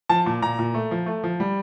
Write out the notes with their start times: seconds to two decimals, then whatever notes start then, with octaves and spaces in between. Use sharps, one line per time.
0.09 F3 A5
0.26 A#2
0.42 A#2 A#5
0.59 A#2
0.74 A3
0.91 F3
1.06 A3
1.24 F3
1.40 G3